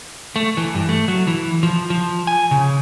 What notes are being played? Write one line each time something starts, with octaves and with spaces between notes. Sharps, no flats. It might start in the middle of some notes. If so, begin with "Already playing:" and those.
A3
E3
G2
A3
F#3
E3
F3
F3
G#5
C#3